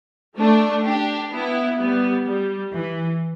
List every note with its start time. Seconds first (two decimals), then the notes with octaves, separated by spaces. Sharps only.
0.38 A3 D4
0.85 D4 G4
1.32 B3 E4
1.80 G3 B3
2.26 G3
2.74 E3